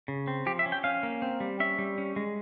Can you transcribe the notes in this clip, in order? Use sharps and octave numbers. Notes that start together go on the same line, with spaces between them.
C#3
C4
F3 G4
E5
C#4
G5
C#4 F5
A#3
C4
G3
C#4 E5
G3
C#4
G#3